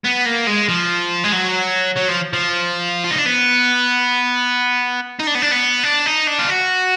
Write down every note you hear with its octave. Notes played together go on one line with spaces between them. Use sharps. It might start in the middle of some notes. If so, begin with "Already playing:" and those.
B3
A#3
G#3
F3
G#3
F#3
F#3
F3
F3
F4
D#4
D4
B3
D#4
D4
B3
D4
B3
D4
D#4
D4
F4
F#4